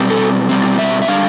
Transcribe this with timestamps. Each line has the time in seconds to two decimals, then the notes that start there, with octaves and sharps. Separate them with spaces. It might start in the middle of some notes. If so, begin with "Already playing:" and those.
Already playing: B2 G3 C4
0.10 A4
0.49 B2 G3 C4
0.79 E5
1.02 E5
1.07 D3 G3 D4 F5